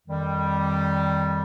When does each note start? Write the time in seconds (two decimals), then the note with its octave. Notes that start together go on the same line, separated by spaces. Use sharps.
0.06 F2 D#3 G3